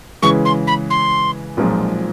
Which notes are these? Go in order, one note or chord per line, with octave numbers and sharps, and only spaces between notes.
C#3 E3 G#3 C#6
C6
B5
C6
B1 A#2 F3 G#3 C4